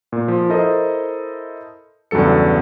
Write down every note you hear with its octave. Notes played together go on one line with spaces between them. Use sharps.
A#2
F3
E4 A4 A#4 C5 D#5
E2 G2 C#3 F#3 A4 C#7